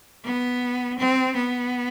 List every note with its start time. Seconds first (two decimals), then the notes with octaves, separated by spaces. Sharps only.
0.24 B3
0.99 C4
1.36 B3